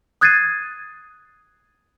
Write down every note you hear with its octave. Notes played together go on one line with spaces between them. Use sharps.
D#6 F#6 G#6 A6 C7 D#7